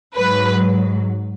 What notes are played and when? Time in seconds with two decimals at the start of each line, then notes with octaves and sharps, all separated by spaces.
0.17 G#2 F#3 B4